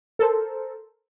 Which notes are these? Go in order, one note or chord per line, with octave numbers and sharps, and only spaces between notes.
A4 A#4 C5